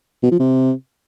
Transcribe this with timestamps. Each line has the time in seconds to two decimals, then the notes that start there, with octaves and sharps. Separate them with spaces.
0.23 B2
0.31 F3
0.40 C3